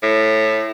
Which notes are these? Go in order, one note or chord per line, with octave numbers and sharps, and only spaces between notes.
A2